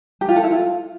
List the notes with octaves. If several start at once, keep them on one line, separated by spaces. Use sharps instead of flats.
G4
F4
A4
E4
F4